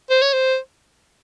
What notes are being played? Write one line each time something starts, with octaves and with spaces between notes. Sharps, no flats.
C5
C#5
C5